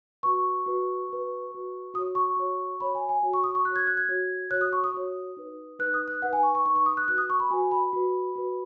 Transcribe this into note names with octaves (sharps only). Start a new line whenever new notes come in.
F#4 B4 C#6
F#4 B4
F#4 B4
F#4 B4
F#4 C#5 D#6
C#6
F#4 C#5
F#4 C#5 B5
G#5
G#5
F#4 C#5
C#6
D#6
C#6
F#4 C#5 F#6
G#6
F#6
G#6
F#4 C#5
F#4 C#5 F#6
D#6
C#6
D#6
F#4 C#5
D#4 B4
D#4 B4 F#6
D#6
F#6
D#4 B4 F#5
G#5
C#6
C#6
D#4 B4 C#6
C#6
D#6
F#6
F#4 B4 F#6
D#6
C#6
B5
F#4 B4 G#5
B5
F#4 B4
F#4 B4